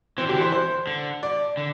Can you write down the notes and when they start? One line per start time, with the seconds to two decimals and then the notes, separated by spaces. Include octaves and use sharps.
0.18 E3 C4
0.26 D3 G4
0.35 E3
0.41 C5
0.52 C5
0.87 D3
1.23 D5
1.57 D3